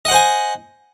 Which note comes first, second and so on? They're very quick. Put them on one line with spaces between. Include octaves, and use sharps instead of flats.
D#5 F#5 C5 G#5